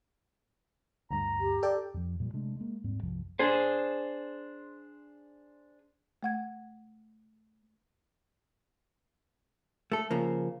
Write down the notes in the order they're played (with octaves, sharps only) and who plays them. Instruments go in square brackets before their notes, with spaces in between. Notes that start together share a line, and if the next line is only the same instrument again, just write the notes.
[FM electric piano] D2 G2 [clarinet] A#5
[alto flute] G4
[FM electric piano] A4 D5 G5
[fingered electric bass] F2 F3
A#2 F3 G3
C3 G#3 A3 D4
G#3 A#3
D#1 G#2 G3 C4
B1 F#2 C3 F3
[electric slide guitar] D4 G#4 C5
[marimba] A3 F#5 G#6
[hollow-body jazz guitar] A3 A4
C#3 F3 A#3